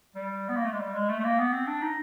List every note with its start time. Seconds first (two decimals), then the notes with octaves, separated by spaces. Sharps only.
0.15 G3
0.49 B3
0.57 A#3
0.65 A3
0.73 G#3
0.80 G3
0.95 G#3
1.09 A3
1.20 A3
1.24 A#3
1.39 B3
1.53 C4
1.67 D4
1.83 D#4